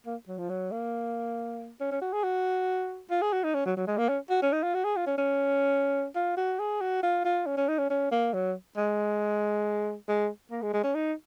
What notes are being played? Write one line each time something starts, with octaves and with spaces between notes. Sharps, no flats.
A#3
F#3
F3
F#3
A#3
C#4
C#4
F#4
G#4
F#4
F4
G#4
F#4
D#4
C#4
F#3
F#3
G#3
A#3
C#4
F#4
C#4
D#4
F4
F#4
G#4
F4
C#4
C#4
F4
F#4
G#4
F#4
F4
F4
C#4
C#4
D#4
C#4
C#4
A#3
F#3
G#3
G#3
A#3
G#3
G#3
C#4
D#4